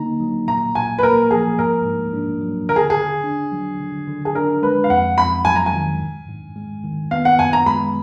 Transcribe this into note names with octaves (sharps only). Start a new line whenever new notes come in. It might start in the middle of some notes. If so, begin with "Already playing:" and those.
Already playing: D3 A#3 D#4 A#5
F#3
A#2 A#5
A#2 G#5
B4
A#3 A#4
F3 G#4
G#2 A#4
G#2
D4
F#3
D3 A#4
G#4
G#4
D3
D4
F#3
D3
D3
G#4
D4 A#4
G#3 B4
F5
F2 F#5
F2 B5
F#3 G#5
A#5
G#5
D#3
G#2
G#2
G#3
D#3
B3 F5
F#5
F#2 G#5
A#5
G#3 B5